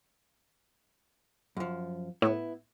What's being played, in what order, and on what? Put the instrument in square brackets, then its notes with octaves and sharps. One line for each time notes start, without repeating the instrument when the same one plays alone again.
[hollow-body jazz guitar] F#2 F3
[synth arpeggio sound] A2 [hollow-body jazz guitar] B3 E4